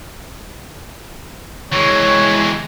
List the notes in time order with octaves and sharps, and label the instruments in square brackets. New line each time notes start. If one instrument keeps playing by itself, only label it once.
[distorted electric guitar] E3 G#3 [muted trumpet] C#5